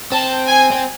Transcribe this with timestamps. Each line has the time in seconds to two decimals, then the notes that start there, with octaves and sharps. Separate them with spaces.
0.12 C4 A5
0.47 G#5
0.71 C4